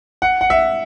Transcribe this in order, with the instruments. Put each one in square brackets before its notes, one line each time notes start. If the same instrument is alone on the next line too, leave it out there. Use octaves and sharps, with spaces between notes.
[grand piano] F#5
F#5
E5